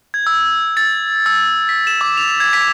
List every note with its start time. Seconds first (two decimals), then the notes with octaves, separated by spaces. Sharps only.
0.14 G#6
0.27 E6
0.77 A6
1.26 E6
1.69 B6
1.87 E7
2.01 D6
2.17 F7
2.40 G#6
2.53 B6